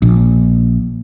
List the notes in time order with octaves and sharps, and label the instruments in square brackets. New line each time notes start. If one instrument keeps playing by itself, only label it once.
[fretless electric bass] A#1